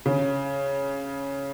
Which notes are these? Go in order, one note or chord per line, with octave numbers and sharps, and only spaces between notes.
C#3